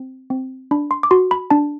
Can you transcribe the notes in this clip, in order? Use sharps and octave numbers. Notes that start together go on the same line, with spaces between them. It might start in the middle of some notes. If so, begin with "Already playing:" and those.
Already playing: C4
C4
D4 B5
C6
D6
F#4 C6
B5
D4 A5